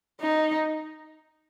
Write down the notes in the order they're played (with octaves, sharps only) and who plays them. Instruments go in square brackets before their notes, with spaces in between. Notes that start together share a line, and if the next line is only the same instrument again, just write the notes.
[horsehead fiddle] D#4